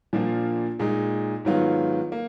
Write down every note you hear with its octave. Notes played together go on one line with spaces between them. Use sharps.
A#2 F3 A#3 D4 F4
A#2 G#3 D#4
G#2 D#3 F#3 B3 F4
A#3